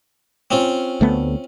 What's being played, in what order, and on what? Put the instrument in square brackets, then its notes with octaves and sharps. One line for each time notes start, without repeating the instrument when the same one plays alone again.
[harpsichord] C4 C#4 F4
[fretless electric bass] D2 A3 B3